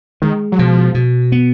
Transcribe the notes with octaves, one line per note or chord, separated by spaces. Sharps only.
D#3 G#3
F#3
B2 F3
B2
B3